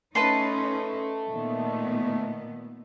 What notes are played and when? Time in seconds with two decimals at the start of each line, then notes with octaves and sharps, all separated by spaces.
0.15 A3 C#4 D#4 B4 A5 C6
1.31 A#2 D#3 B3